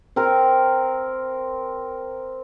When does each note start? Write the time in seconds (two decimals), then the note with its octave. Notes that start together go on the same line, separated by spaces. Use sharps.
0.16 C4 A#4